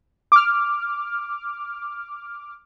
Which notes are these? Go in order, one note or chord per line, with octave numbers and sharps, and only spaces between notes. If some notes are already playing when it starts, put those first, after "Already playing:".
D6 F6